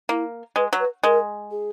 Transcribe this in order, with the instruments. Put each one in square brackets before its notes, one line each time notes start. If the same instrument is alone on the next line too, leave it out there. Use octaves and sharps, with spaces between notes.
[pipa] A#3 [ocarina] E4
[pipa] G#3 [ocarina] B4
[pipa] F#3
[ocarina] B4
[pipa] G#3 [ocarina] A#4
[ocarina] G#4